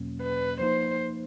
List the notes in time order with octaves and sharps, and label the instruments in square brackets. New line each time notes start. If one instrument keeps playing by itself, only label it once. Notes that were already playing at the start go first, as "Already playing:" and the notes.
Already playing: [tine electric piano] E2 B2 F#3 A#3 C#4
[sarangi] B4
[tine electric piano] F3 A#3 D#4 [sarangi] C5